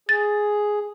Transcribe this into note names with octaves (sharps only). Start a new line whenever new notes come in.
G#4 A6